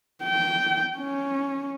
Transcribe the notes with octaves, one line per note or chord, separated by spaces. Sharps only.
G5
C#4